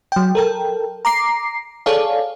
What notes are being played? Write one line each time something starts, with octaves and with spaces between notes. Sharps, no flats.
F#3 G5
A4 A#4 G5
A#5 D6 C7
G#4 A4 C#5 D5 F5